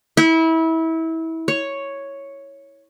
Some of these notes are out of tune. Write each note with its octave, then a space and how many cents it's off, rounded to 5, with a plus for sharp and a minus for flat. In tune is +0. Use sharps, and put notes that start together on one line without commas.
E4 -25
C#5 +0